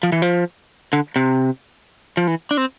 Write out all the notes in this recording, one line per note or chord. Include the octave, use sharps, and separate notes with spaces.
F3
E3
F3
D3
C3
F3
E3
D4
C4